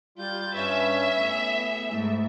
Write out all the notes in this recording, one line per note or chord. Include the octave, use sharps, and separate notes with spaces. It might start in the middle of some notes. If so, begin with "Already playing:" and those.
G3 F4 G6 A6
G2 C#4 B4 C#5 E5
A2 B3 G#4
G#2 A3 E4